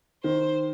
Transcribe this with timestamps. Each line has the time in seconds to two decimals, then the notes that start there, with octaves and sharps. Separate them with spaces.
0.24 D#3 C5